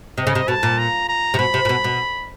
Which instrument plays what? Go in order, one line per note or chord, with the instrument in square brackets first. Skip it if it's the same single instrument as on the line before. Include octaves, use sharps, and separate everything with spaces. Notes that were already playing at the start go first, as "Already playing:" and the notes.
[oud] C3 [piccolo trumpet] D#5
[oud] C#3
C3
[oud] B2 [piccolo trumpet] A5
[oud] A#2
[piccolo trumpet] A#5
A#5
[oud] C3
[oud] B2 [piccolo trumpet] B5
[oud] C3
A#2
B2
B2